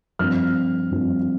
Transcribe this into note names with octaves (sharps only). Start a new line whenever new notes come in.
G2 F3 C4 F6
G2 F3 C4